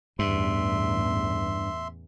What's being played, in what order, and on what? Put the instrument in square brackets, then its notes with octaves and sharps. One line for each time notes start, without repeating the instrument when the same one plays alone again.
[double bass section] A1 E2 [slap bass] G2 [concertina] E5 C6